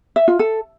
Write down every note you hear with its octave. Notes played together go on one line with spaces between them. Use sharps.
E5
F4
A4